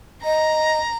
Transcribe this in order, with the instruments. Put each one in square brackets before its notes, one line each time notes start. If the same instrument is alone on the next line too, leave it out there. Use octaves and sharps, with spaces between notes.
[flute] D#5 [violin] A#5